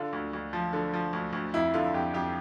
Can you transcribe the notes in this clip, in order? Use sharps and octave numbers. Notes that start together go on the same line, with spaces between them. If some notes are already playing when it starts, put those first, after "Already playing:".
Already playing: D3 F4
D2
D2
F3
D3
F3
D2
D2
F2 E4
D3 F4
F2 G4
F2 G4